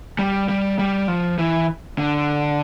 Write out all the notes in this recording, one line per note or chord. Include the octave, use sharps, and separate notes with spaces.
G3
G3
G3
F3
E3
D3